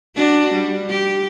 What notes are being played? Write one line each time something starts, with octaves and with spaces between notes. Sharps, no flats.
D4 F#4
G3
G4